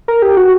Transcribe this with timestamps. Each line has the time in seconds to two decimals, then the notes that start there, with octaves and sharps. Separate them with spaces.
0.08 A#4
0.22 G4
0.37 F#4